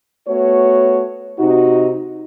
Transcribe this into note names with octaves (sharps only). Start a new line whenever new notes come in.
A3 B3 F#4 C#5
C3 D#4 F#4